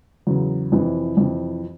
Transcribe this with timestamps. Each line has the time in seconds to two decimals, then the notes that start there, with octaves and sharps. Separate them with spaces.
0.27 E2 C#3 F#3
0.72 F2 C3 E3
1.17 F2 C3 E3